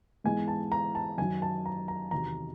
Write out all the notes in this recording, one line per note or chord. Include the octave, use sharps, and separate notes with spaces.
G#2 E3 G#3 B3 G#5
A5
A#5
A5
F#2 D#3 F#3 G#5
A5
A#5
A#5
E2 C3 D#3 F#3 A#5